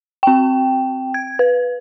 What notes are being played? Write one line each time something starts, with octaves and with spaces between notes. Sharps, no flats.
C4 G5
G#6
B4